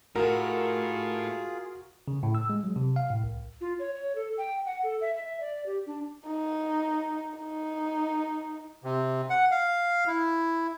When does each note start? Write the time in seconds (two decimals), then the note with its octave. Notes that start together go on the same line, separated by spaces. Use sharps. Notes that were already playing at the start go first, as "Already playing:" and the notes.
0.16 A2 F4 F#4 G#4 A#4
2.08 C#3
2.23 A2
2.35 E6
2.50 G#3
2.64 F#3
2.76 C3
2.96 F5
3.10 A2
3.23 C2
3.61 F4
3.79 C#5
3.95 C#5
4.15 A4
4.38 G5
4.66 F#5
4.83 A4
5.01 E5
5.16 E5
5.41 D5
5.66 G4
5.86 D4
6.27 D#4
7.39 D#4
8.84 C3
9.30 F#5
9.51 F5
10.07 E4